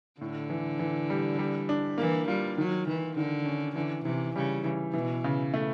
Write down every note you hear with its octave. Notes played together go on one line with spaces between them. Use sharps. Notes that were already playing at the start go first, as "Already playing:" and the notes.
A2 D3
E3
E3
G3
G3
D4
E3 A#3
G3 F4
D#3 F#3
D#3 E3
D3 D#3
C#4
D3 E3
C3 E3
C#3 G3
E3
B2 E3
C#3
A3